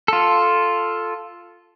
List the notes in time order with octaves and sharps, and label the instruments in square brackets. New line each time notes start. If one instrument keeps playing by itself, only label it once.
[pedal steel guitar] F4 A4